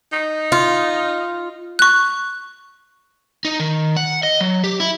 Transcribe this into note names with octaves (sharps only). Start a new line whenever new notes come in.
D#4
F4
C#6 F#6
D#4
D#3
F#5
D#5
F#3
G4
E4